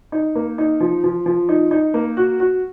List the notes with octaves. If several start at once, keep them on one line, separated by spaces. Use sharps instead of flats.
D#4
A#3
D#4
F3
F3
F3
D#4
D#4
A#3
F#4
F#4